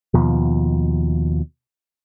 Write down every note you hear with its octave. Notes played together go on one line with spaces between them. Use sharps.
D#2 B2 F3